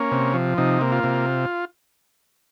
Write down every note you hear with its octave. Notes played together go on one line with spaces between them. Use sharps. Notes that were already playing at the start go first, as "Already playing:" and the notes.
Already playing: A#3 C#4
C3
F3
C3 D#4
A#3
F4
C3